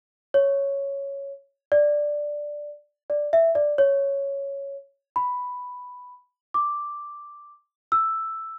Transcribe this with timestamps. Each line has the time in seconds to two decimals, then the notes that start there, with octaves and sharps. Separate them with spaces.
0.34 C#5
1.72 D5
3.10 D5
3.33 E5
3.55 D5
3.78 C#5
5.16 B5
6.54 D6
7.92 E6